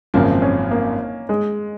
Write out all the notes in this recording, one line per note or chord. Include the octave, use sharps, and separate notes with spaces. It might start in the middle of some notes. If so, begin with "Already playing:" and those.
G#1 F#2 C#3 F3 A#3 C4
C#4
A#3
G#3